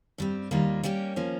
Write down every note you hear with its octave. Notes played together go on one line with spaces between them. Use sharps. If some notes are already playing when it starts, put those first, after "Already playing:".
G2 G3 C4
D#2 D#3 G3 A#3 F4
G3 A#3 C#4 G4
F3 A#3 C#4